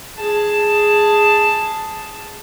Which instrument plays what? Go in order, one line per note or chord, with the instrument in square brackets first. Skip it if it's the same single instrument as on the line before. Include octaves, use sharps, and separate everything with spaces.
[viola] G#4 A5